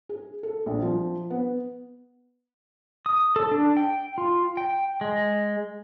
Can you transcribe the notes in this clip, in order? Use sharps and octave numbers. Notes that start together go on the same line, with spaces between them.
G#4
A4
A#1
F3
B3
D#6
A4
D4
G5
F4
G5
G#3